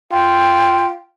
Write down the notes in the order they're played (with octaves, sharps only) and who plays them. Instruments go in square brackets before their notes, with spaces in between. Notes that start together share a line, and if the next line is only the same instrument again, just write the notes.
[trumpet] F4 [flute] G5